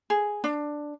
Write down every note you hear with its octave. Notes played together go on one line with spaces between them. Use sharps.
G#4
D4